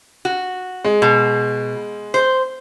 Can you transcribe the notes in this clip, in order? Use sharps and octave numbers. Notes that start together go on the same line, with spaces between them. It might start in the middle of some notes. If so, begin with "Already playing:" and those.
F#4
G#3
B2
C5